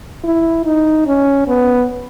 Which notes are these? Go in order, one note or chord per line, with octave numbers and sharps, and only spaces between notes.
E4
D#4
C#4
B3